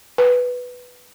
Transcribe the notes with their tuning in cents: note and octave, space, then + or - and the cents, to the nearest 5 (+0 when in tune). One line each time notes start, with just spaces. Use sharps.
B4 +0